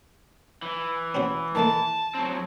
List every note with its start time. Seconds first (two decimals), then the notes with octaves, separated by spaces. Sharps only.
0.62 E3
1.15 C4 C#4 F#4
1.55 D#3 A3 A#3 A5
2.15 F#3 C4